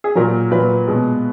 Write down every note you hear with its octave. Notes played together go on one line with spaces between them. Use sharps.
G#4
A#2 F#3 A#4
A#2 F#3 B4
B2 G#3